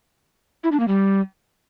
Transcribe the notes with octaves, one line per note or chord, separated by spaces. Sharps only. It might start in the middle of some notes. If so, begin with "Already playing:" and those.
E4
D4
A#3
G3